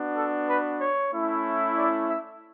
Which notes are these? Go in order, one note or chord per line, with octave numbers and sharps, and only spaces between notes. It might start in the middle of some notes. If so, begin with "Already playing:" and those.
Already playing: B3 D4 F#4
A4
B4
C#5
A3 C#4 E4
D5
E5